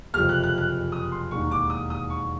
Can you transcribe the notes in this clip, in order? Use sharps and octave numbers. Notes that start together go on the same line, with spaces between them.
F#1 F2 C3 F3 F6
F#6
F#6
F#6
D#6
C6
E1 D#2 D#3 C#6
D6
D#6
D#6
C#6